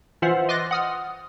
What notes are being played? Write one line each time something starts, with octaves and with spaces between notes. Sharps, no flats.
E3 F4 C5 E5 F#5
D#5 C6 D6 F#6 A6 A#6
F#5 D#6 F6